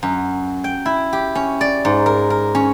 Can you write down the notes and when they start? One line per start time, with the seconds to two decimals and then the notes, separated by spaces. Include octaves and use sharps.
0.03 F#2
0.64 G5
0.86 E4
1.13 G4
1.35 C#4
1.61 D5
1.85 G#2
2.06 A#4
2.30 A#4
2.55 C#4